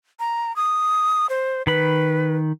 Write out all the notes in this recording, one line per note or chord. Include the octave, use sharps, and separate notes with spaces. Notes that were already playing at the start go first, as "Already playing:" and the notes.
A#5
D#6
C5
D#3 B4 B5